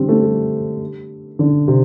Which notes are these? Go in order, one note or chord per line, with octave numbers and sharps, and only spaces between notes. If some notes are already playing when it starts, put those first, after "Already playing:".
Already playing: D3 G3 C4
A3
G3
D3
C3